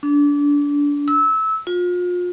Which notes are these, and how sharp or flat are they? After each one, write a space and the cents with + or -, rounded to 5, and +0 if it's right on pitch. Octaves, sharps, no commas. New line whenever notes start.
D4 -25
E6 -20
F4 +35